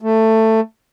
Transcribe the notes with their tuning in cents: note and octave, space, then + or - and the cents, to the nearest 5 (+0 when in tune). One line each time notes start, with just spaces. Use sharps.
A3 +15